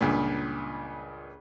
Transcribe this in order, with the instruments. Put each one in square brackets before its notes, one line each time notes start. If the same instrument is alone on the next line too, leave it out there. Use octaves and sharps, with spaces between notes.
[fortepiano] C#2 G2 A#2